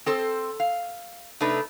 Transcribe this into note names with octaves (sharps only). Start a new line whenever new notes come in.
C4 A4 C5
F5
C3 A3 D4 D#4 B4